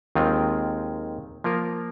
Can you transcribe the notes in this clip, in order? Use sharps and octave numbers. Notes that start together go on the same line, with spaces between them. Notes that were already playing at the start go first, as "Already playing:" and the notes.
D#2 D#3 G#3 C4 F4
F3 A#3 F4 A#4